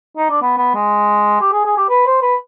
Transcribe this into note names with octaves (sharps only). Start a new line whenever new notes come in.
D#4
D4
B3
B3
G#3
G4
G#4
G#4
G4
B4
C5
B4